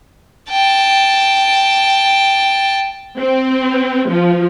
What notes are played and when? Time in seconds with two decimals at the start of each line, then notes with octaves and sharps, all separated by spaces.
0.51 G5 A5
3.19 C4
4.11 F3